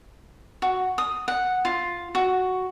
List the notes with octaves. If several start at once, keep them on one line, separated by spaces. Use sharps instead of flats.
F#4
D#6
F#5
F4
F#4